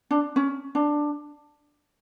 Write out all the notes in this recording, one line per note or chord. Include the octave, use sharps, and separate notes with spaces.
D4
C#4
D4